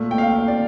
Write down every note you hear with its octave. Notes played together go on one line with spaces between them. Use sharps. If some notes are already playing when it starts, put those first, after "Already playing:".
Already playing: A#2 A3
G5
F5
D5